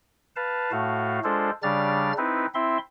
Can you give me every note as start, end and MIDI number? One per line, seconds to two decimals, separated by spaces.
0.36 0.72 71
0.36 0.72 77
0.36 0.72 81
0.72 1.20 45
0.72 1.20 57
0.72 1.20 66
0.72 1.20 77
1.24 1.50 56
1.24 1.50 62
1.24 1.50 65
1.24 1.50 69
1.24 1.50 72
1.63 2.13 49
1.63 2.13 55
1.63 2.13 62
1.63 2.13 89
1.63 2.13 93
2.17 2.46 60
2.17 2.46 63
2.17 2.46 64
2.17 2.46 71
2.54 2.78 60
2.54 2.78 64
2.54 2.78 76
2.54 2.78 84